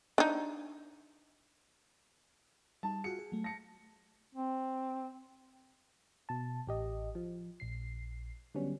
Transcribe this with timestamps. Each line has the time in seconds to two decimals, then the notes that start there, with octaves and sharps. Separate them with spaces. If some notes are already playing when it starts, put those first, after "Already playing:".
0.18 D4 D#4
2.83 G3 D#4 A5
3.04 F4 F#4 G#4 C#7
3.19 G#4
3.32 F#3 A3
3.44 A5 A#6 C#7
4.35 C4
6.29 B2 A5
6.67 A1 G4 D#5
7.15 F3
7.60 A#1 C7
8.54 D3 F#3 G3 B3 C#4